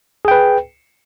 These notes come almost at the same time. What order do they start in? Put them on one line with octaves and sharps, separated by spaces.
G#4 G5 B4